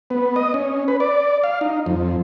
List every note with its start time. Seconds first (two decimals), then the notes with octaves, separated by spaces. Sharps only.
0.10 B3
0.36 D#5
0.54 C#4
0.88 B4
1.00 D5
1.44 F5
1.61 D#4
1.86 F2